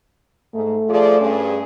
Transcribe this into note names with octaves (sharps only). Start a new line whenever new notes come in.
G#2 A3
F3 G#4 D5
G2 C#4 G#4